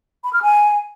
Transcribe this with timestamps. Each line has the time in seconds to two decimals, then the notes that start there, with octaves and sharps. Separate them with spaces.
0.24 B5
0.33 F6
0.42 G#5